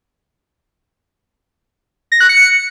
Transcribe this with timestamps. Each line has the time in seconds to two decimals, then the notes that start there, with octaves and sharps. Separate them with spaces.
2.12 A#6
2.20 F#6
2.29 C#7